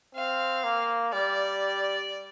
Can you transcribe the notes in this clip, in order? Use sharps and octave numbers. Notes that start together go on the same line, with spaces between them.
C4 F5
A#3
G3 D5